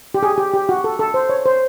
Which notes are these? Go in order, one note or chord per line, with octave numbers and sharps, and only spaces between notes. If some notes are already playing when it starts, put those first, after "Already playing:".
G4
G#4
G4
G4
F#4
A4
A4
C5
C#5
C5